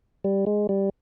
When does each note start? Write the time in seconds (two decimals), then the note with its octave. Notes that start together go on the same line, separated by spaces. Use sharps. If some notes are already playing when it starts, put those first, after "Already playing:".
0.24 G3
0.47 G#3
0.69 G3